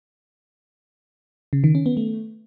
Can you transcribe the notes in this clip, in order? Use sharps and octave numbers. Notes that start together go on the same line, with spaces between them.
C#3
D#3
C#4
B3
A3